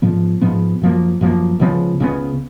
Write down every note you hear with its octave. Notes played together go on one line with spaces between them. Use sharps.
G#2 F3 B3
G#2 F3 B3
F#2 F3 A#3
F#2 F3 A#3
C#2 C#3 F3 B3
C#2 C#3 F3 B3